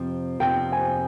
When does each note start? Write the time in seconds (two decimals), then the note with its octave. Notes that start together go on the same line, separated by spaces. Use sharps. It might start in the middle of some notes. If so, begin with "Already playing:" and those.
Already playing: F2 C3 F3 C4
0.40 F2 C3 F3 C4 G5
0.72 G#5